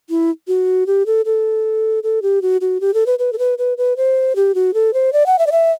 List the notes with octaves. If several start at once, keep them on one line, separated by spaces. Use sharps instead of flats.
E4
F#4
G4
A4
A4
A4
G4
F#4
F#4
G4
A4
B4
B4
A4
B4
B4
B4
C5
G4
F#4
A4
C5
D5
F#5
E5
D5
E5